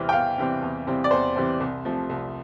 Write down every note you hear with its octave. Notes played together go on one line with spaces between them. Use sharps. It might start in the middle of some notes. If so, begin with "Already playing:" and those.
Already playing: E2 C3 E3 G3 C4 F6
G5
E2 F5
C3 E3 G3 C4
E2
C3 E3 G3 C4
D5
E2 C5
C3 E3 G3 C4
C2
C3 F3 A3
C2